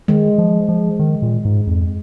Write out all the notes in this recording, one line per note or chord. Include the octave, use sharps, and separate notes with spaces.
D#3 G#3
F3
F3
D#3
A#2
G#2
F2